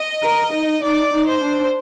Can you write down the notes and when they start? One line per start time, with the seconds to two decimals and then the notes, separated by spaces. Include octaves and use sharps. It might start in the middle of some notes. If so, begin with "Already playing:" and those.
Already playing: D#5
0.23 A#4
0.53 D#4
0.82 D#4 D5
1.12 D#4
1.27 C5
1.41 D4